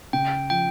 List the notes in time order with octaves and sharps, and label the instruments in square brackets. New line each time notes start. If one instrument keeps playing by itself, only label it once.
[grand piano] C#3 [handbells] G5
[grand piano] F3 [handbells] G5